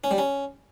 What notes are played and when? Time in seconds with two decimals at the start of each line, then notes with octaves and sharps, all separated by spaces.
0.04 C#4
0.11 G3
0.18 C#4